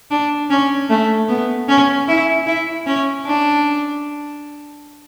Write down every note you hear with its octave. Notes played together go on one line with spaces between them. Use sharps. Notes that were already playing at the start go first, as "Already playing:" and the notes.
D4
C#4
A3
B3
C#4
E4
E4
C#4
D4